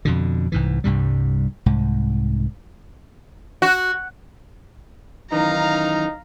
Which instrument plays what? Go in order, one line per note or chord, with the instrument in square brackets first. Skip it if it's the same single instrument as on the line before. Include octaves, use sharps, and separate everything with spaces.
[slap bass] F2 B2 D3
C2 G#2 E3
C2 G2 C3 G3
C2 G#2
[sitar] F#4
[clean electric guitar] F#2 D#3 E3 [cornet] D#4 [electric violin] F5 A#5